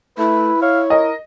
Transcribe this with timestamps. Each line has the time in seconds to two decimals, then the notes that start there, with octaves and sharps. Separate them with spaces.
0.18 A3 E4 B4
0.62 C#5 F5
0.90 A#4 D#5